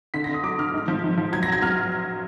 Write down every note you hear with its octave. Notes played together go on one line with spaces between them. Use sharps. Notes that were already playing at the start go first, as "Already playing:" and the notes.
D3 B6
A#6
D3
D#6
F#3 D6
D3 F6
G#2
F3
G#2
F3
F#3 G#6
A#6
F#3 G#6
F#3 F6